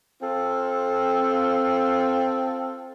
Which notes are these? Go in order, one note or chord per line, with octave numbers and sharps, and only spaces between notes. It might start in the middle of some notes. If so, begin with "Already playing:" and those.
C4 F4 A4